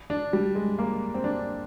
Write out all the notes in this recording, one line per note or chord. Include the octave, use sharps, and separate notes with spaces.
D4
G3
G#3
A#3
C4
D4